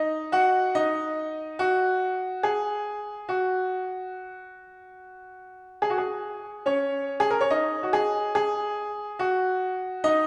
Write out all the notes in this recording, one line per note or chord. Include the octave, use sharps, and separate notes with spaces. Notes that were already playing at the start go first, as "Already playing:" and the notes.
Already playing: D#4 D#5
F#4 F#5
D#4 D#5
F#4
G#4
F#4
G#4
F#4
G#4
C#4 C#5
G#4
A#4
C#5
D#4 D#5
F#4
G#4
G#4
F#4
D#4 D#5